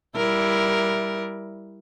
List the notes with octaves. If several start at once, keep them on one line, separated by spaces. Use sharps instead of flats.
G3 E4 A#4